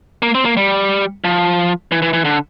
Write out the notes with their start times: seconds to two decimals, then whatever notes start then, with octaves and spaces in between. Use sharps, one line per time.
0.22 A#3
0.35 C4
0.45 A#3
0.57 G3
1.24 F3
1.92 E3
2.02 E3
2.13 E3
2.25 D3